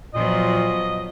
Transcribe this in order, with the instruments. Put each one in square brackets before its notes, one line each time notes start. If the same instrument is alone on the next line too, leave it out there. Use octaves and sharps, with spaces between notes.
[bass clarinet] A#2 [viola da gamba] F3 F#3 B3 [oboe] D#5